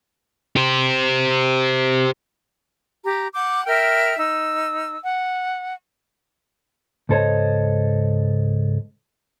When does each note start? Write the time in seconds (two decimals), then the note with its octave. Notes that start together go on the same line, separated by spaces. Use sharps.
0.57 G4 C5
3.04 G4 A#5
3.34 F#5 D6 G6
3.65 A#4 E5 G5 F6
4.18 D#4 E6
5.04 F#5
7.09 C#2 G#2 A4 C5 C#5 D#5